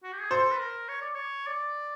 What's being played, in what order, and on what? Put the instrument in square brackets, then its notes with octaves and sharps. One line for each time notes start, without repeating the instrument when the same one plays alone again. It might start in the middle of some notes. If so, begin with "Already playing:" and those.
[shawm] F#4
G4
G#4
[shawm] A4 [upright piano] C5
[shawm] B4
A#4
C#5
D5
C#5
D5